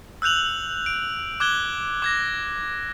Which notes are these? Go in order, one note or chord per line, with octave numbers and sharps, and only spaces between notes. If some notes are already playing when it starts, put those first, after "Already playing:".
E6 F#6 G6 F7 F#7
D7
D6 F#6 G#6 G7
D6 G#6 A#6